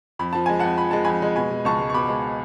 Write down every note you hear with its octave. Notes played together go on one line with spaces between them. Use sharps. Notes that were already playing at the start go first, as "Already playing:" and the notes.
F2 B5
F3 A5
G#3 G#5
F2 F#5 A5
F3 B5
G#3 A5
F2 G#5 B5
G#3
B2 G#5 B5
B2
C#2 A5 C#6
G#3
C#6
B2 B5 D6
G#3